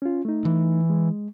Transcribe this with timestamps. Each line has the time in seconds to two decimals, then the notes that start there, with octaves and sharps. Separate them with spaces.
0.02 C#4 F4
0.25 A3 D#4
0.45 E3
0.90 G#3